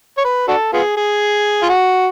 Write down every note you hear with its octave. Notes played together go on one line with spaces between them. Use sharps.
C#5
B4
D4 F#4 A4
B3 F4 G#4
G#4
F4
F#4